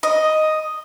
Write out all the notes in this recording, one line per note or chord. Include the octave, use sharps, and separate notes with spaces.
D#5